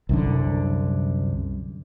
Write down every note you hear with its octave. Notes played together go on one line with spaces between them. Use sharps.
C2 F#2 D3